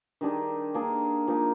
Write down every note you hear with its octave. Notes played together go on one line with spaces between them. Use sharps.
D#3 G3 D4 G#4
A#3 D4 G#4
F3 A#3 D#4 G#4